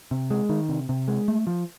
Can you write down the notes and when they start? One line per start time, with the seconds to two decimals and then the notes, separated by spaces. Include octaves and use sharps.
0.11 C3
0.30 G#3
0.49 D#3
0.69 C3
0.89 C3
1.08 G#3
1.28 A3
1.47 F3